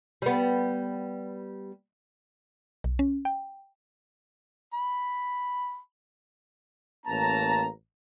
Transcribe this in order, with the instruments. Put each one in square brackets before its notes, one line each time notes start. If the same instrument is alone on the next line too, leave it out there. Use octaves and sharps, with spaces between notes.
[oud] G3 B3
[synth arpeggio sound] B1
C#4
G5
[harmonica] B5
[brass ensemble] A1 A#3 C#4 A5 A#5